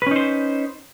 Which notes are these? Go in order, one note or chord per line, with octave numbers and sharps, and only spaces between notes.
C#4 D#4 B4 C5